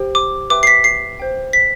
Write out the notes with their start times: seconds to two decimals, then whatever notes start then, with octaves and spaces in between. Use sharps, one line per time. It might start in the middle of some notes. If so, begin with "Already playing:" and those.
Already playing: G4 C5 G5
0.15 D6
0.50 B4 E5 G5 D6
0.63 C7
0.67 B6
0.84 C7
1.19 C5 G5
1.53 B6